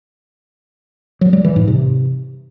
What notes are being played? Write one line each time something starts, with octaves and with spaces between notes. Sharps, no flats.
F#3
G3
E3
G#2
C3